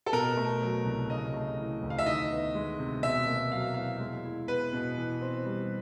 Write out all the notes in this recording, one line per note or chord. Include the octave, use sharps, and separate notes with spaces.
A4
B2 A#4
A3
F#3
C2
C#3 D#5
A3
E3
D2
F5
E5
D#3 D#5
B3
G#3
C3
B2 E5
A#3
F#3 F5
E2 F5
G#3
E4
B3 B4
B2
E3
C4
G3